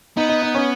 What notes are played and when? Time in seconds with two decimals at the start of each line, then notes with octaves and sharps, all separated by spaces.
0.17 B3 D#4
0.29 D#4
0.42 D#4
0.55 C#4